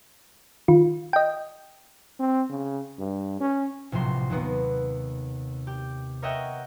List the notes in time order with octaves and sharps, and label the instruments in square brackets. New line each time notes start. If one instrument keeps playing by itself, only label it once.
[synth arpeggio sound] D#3 F4
D#5 G5
[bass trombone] C4
C#3
G2
C#4
[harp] A#1 A2 C3 F#3 C6 C7
D#2 C3 B3
G4
A#4 C#5 D#5 E5 F#5 G5